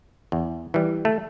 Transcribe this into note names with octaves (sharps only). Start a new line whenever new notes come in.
E2
E3 G3
A3